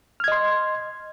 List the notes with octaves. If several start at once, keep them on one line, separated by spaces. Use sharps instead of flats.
D#5 C6 F6 G#6